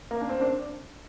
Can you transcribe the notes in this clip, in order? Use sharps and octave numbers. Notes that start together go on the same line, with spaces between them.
A#3
D4
C4
D4